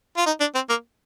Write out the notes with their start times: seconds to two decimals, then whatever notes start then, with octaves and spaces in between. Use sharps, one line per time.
0.17 F4
0.26 D#4
0.40 D4
0.55 C4
0.69 A#3